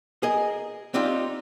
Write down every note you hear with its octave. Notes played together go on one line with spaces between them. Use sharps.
G#4 A#4 D#5
C4 D4 D#4 F4 G4